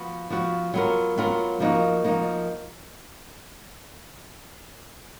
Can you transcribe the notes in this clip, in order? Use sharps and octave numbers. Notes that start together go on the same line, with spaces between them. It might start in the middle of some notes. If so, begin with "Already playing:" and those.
Already playing: F3 B3 F#4
F3 B3 F#4
F#3 B3 F4 A#4
F#3 B3 F4 A#4
F3 A#3 D#4 F#4
F3 A#3 D#4 F#4